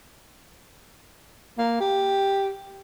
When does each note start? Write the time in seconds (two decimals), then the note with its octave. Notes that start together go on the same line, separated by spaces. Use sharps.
1.58 A#3
1.80 G4